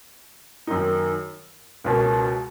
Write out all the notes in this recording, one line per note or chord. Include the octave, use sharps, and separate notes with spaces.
F#2 D#3 A#3 D#4
C#2 B2 A#3 C#4